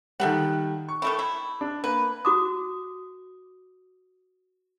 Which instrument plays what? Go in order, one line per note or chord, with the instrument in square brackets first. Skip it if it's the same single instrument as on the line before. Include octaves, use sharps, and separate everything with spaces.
[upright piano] D#3 G3 [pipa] A4 E5 F#5
[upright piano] C#6
[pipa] D#3 A3 E4
E4
[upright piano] D4
[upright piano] A#3 [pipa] B4
[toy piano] F#4 D6 D#6